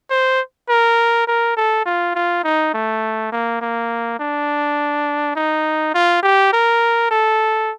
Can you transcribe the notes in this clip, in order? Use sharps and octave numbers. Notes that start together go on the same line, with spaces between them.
C5
A#4
A#4
A4
F4
F4
D#4
A3
A#3
A#3
D4
D#4
F4
G4
A#4
A4